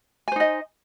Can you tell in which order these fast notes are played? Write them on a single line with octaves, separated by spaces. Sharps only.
G#5 C5 D#4 D#5